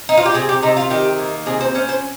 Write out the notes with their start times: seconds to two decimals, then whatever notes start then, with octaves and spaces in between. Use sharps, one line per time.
0.09 D#4
0.17 F4
0.26 G4
0.34 C3 G#4
0.49 G4
0.63 C3 D#4
0.77 F4
0.90 D#3 G4
1.19 A#3
1.46 C3 G#4
1.61 C5
1.75 C#4 C5
1.89 C5